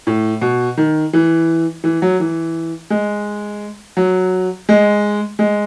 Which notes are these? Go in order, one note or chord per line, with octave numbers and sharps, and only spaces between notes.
A2
B2
D#3
E3
E3
F#3
E3
G#3
F#3
G#3
G#3